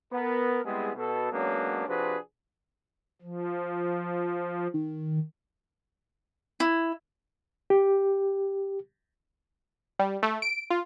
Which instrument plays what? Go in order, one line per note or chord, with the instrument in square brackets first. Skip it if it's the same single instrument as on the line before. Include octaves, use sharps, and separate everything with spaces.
[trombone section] B3 A#4
G3 G#3 B3 C4 E4 G#4
B2 A4
F#3 G#3 A#3 B3 C#4 D4
C3 F3 D4 F#4 G#4 B4
[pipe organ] F3
[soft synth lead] D#3
[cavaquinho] E4
[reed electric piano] G4
[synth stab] G3
A3
D7
F4